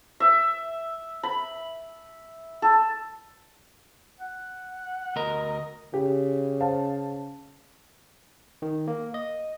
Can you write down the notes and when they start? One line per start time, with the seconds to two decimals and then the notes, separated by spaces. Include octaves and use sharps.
0.20 E5
1.23 B5
2.62 A4
4.20 F#5
5.16 D2 A#4 D#5
5.94 C#3 G4
6.60 C5 F5 A5
8.62 D#3
8.88 A#3
9.14 D#5